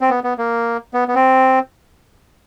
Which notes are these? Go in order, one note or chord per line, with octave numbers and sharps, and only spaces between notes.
C4
B3
B3
A#3
B3
B3
C4